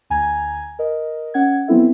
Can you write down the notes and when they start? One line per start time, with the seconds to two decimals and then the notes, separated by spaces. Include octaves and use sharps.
0.10 D2 G#5 A#5 G#6
0.79 A#4 D#5
1.34 C#4 F#5 G#6
1.68 F#3 B3 C4 E4 A4 E5